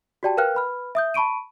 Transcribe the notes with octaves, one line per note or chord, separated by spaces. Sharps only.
F#4 G4 D5 G5 A5
A#4 B4 F5 G5 F6 F#6
B4 B5 F6
E5 D#6 G6
A5 B5 C#6 D7 D#7